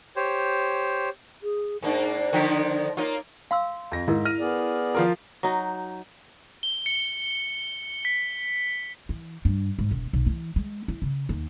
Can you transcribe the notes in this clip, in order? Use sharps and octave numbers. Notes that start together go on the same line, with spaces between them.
G4 C5 C#5
G#4
G#2 A#3 D4 D#4
D5
D3 D#3 F3
A#3 D#4 F4 C#5
F5 C6 E6
F2 A#6
G#2 E4 A#4
F6 A#6 D#7
B3 G#4 D5
F3 F4 A#4
F#3 D#4
G7
C#7
B6
E3
G2
G#2
E1
B1
E3
G#3
E4
C#3
D#2